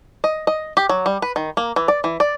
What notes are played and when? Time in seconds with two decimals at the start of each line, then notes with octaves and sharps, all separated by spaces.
0.24 D#5
0.47 D#5
0.77 G4
0.89 F#3
1.06 G3
1.22 B4
1.36 D#3
1.57 A#3
1.76 E3
1.88 D5
2.04 E3
2.20 D5